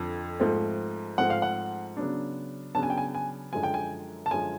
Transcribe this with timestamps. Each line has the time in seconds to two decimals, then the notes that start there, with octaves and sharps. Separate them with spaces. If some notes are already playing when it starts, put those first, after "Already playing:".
Already playing: F2 D3 F3
0.40 G#2 F3 A3 C4
1.18 G#2 F3 A3 C4 F#5
1.30 F5
1.42 F#5
1.97 C#3 F#3 B3 D4
2.75 C#3 F#3 B3 D4 A5
2.83 G#5
2.90 G5
2.98 G#5
3.15 G#5
3.53 F#2 D3 F3 G#3 G#5
3.63 G5
3.74 G#5
4.26 A5
4.31 F#2 D3 F3 G#3 G#5